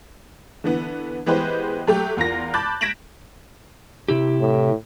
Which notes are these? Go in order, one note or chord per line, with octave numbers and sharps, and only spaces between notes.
D3 E3 B3
E3 G#3 B3 G4 B4 C5
F#3 A3 G4
E2 F4 A#4 A#6
A5 B5 D6 F#6 G6 A6
G#6 A#6 B6 D7 E7 F#7
C3 E4 G4
A2